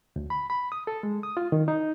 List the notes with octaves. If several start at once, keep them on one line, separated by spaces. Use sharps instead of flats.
D2
B5
B5
D#6
A4
G#3
D#6
F4
D#3
D#4